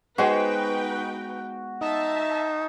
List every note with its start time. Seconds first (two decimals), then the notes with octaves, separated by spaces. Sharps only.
0.18 G#3 B3 D#4 F#4 B4 C5 G5
1.81 D#4 E5 A5